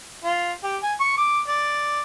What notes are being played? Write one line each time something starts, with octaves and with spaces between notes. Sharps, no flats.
F4
G4
G#5
C#6
D6
D5